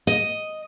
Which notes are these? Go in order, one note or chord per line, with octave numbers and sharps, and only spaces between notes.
D#5